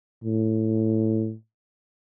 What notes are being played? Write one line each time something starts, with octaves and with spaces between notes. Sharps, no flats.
A2